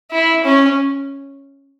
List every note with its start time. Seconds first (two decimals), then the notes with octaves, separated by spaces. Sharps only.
0.11 E4
0.44 C#4